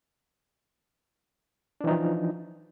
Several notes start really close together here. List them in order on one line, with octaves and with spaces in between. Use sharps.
D4 E3 D#4 F3